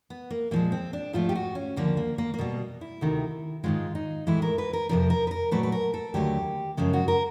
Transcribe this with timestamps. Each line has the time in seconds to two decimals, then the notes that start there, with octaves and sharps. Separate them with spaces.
0.10 B3
0.30 A#3
0.51 A#2 F3 G#3 A#3
0.72 C4
0.93 D4
1.13 G#2 F3 A3 F4
1.29 G4
1.35 F#4
1.55 C#4
1.76 D#2 D3 F3 A#3
1.97 A#3
2.18 A#3
2.34 A#3
2.38 B2 G3 B3
2.81 E4
3.01 D2 C3 D#3
3.64 G#2 D#3 G#3 F4
3.95 D#4
4.27 A2 E3 G#3 E4
4.42 A#4
4.58 B4
4.73 A#4
4.89 F2 C3 F3 A#4
5.10 A#4
5.27 B4
5.31 A#4
5.51 A#2 F#3 A3 B4
5.63 B4
5.72 A#4
5.94 A4
6.14 D#2 D3 F#3 A3 G4
6.77 F#2 C#3 F3 G#3
6.93 F#4
7.08 A#4